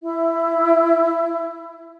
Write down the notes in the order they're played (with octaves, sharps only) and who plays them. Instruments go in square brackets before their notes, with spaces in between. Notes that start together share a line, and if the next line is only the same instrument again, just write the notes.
[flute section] E4 E5